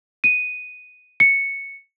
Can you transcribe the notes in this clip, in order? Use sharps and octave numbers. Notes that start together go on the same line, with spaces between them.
D#7
C#7